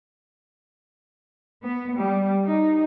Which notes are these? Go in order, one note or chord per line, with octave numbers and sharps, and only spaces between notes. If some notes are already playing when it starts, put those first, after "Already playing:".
B3
G3
D#4